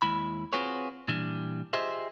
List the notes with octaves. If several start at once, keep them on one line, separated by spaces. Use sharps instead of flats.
D#2 G#3 E4 B5
C4 F4 F#4 G#4 B4 C#5
A#2 E3 G3 D4
F4 G4 G#4 C5 D#5 E5